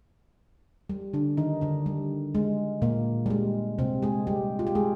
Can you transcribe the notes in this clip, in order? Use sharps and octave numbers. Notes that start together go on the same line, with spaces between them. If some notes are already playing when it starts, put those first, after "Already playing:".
G3
D3 D4
D#3 D#4
D3 D4
G3
G#3
A#2 A#3
G3
G#3
C3 C4
G#3 G#4
G3 G4
F4
G4
G#3 G#4